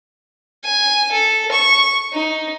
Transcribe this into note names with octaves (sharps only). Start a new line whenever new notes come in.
G#5
A4
C#6
D#4